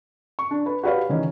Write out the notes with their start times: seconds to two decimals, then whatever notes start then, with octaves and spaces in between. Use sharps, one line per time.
0.39 C#6
0.51 D4
0.66 B4
0.83 F#4 G4 B4 C#5 F5
1.09 D#3 E3 C#4 D#4